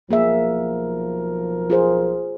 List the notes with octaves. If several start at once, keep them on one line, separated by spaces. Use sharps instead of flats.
B1 F3 A#3 G#4 A#4 E5
F4 G#4 C5